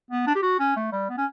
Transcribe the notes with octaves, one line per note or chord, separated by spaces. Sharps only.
B3
D4
G4
F#4
C#4
A3
G3
B3
C#4